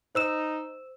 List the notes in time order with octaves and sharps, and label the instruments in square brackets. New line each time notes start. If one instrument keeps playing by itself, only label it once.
[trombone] D#4 [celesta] C5 E6 E7